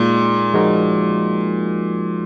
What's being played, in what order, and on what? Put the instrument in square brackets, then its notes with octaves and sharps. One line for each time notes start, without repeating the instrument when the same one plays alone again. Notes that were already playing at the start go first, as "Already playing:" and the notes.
Already playing: [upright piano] A#2 [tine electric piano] G#3 D#4 G#4
[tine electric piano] F3 G#3 D#4 F#4 A#4